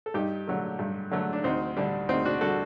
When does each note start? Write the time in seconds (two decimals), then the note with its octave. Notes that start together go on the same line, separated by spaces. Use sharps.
0.06 A4
0.14 G2 D#4 G4
0.47 D3 F#3 A3
0.79 G2
1.11 D3 F#3 A3
1.33 D4
1.44 D2 C4 D#4
1.77 D3 G3 D4
2.09 D2 C4 D#4
2.25 D4 F#4
2.41 D3 G3 F#4 A4